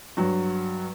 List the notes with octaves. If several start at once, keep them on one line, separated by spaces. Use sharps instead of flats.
G2 F#3